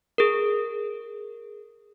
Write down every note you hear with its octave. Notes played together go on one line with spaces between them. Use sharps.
G#4 A#4